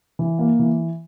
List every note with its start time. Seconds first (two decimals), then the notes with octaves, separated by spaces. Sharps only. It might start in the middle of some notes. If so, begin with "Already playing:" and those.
0.19 E3
0.39 A#3
0.59 E3